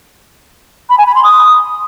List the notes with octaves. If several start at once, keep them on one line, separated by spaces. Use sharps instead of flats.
B5
G#5
B5
C6
D#6